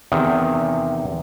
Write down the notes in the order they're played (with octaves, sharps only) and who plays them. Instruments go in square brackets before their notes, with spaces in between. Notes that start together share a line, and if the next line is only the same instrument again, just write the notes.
[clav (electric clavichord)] E2 C3 D#3